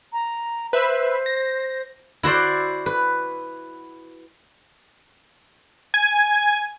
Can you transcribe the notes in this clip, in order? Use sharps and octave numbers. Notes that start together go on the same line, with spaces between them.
A#5
B4 C5 E5
A#6
E4 F#4 C5 D5
B4
G#5